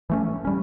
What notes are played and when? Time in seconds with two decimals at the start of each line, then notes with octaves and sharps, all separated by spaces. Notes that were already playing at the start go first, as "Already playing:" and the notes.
0.10 E3 A3 C#4
0.45 G3 C#4